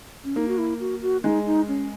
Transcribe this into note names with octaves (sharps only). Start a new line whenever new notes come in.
C#4
A#3 D#4
F#4
E4
F#4
F#4
G#3 D#4
D#4
C#4